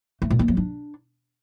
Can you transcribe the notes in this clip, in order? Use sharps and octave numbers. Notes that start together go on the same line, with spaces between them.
A3
A#2
A#3
F#3
D4